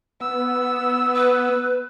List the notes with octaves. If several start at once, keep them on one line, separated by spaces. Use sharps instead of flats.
B3 E6
B4